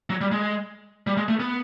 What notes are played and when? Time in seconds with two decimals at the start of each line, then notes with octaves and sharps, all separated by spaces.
0.10 F#3
0.21 G3
0.32 G#3
1.07 G3
1.17 G#3
1.28 A3
1.40 B3